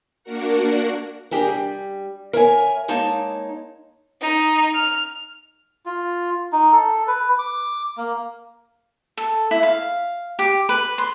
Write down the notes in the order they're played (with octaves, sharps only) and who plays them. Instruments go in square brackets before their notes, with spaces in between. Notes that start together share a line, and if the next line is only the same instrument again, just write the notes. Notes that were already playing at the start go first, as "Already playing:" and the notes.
[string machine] A#3 D4 F#4 A#4 F#5
[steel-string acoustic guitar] D4 G4 G#4 A#4
G3
A#4 C#5 E5 G#5
G#3 A#3 D#4 C#5 A5
[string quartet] D#4
F6
[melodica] F4
D#4
A4
B4
D6
A#3
[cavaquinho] A4
E4
F5
G4
B4
C6